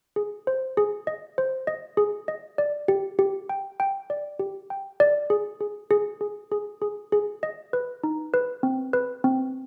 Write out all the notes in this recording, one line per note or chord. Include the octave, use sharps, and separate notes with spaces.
G#4
C5
G#4
D#5
C5
D#5
G#4
D#5
D5
G4
G4
G5
G5
D5
G4
G5
D5
G#4
G#4
G#4
G#4
G#4
G#4
G#4
D#5
B4
D#4
B4
C4
B4
C4